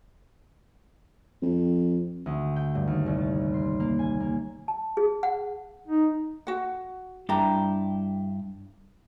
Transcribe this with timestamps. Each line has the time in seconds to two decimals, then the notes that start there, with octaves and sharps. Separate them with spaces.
1.42 F2
2.26 D2
2.56 G5
2.75 G2
2.87 D#2
3.06 C2
3.19 A6
3.54 C6
3.80 A#3
3.99 G#5
4.20 A#3
4.68 A5
4.97 G#4
5.23 F#5
5.88 D#4
6.47 F#4 F#5
7.29 G2 D4 E4 G4 A#5